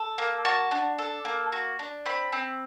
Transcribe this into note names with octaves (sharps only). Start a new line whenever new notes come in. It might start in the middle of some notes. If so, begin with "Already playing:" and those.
Already playing: A4
A#3
F#4 A5
D4
A4
A#3
F#4
D4
C4 B5
C4